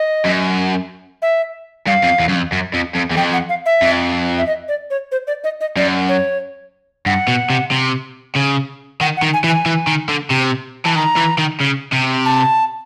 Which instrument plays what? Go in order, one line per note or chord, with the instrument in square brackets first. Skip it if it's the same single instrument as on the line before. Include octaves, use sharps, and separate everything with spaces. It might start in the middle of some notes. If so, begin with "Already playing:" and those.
Already playing: [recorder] D#5
[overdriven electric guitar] F#2
[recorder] E5
[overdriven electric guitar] G2 [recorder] F5
[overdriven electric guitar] F2
E2
F#2
F2
F#2
F2
F2
E2
[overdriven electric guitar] F2 [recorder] G5
[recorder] F#5
F5
E5
[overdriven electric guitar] F2
[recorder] E5
D#5
D5
C#5
C5
D5
D#5
D#5
[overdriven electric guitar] F#2 [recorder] D5
[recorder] C#5
[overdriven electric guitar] G2 [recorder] F#5
[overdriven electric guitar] B2
C3
C3
C#3
[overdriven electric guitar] D#3 [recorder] F#5
[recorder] F#5
[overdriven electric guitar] D#3
[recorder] G#5
[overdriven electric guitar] E3
[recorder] G#5
[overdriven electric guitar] E3
D#3
D3
C3
[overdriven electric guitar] E3 [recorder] A5
[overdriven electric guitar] D#3 [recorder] A#5
[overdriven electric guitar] E3
D#3
C#3
C3
[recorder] A5